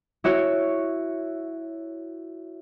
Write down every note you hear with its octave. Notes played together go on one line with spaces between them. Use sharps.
E4 F#4 C#5 E5